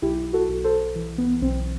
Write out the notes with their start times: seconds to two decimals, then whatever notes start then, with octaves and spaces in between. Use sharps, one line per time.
0.02 B1 E4 G4
0.33 F#4 A4
0.49 B1
0.64 A4 C5
0.95 E3
1.18 B3
1.42 B1 C4